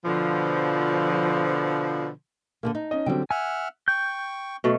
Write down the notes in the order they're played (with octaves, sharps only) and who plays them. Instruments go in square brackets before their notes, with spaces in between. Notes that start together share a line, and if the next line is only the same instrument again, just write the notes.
[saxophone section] B2 D3 F3
[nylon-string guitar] D3 F3 A#3
D#4
[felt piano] C#4 D#5
[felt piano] D3 F#3 C4 [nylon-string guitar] G3 G5
[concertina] E5 F#5 F6 [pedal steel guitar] G#5
[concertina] G5 C#6 [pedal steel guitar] G6
[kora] B2 F#3 A3